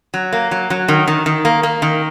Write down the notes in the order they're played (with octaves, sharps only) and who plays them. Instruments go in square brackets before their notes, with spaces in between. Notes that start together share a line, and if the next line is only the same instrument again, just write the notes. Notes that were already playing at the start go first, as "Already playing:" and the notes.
[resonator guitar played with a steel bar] F#3
A#3
F#3
F#3
D#3
D#3
D#3
A#3
A#3
D#3